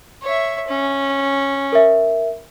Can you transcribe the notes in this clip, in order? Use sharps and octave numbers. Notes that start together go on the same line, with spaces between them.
C#5 E5
C#4
A#4 E5